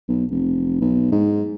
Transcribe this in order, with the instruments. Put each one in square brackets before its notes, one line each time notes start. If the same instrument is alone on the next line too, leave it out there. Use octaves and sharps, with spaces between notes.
[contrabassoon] B1
F1
B1
G#2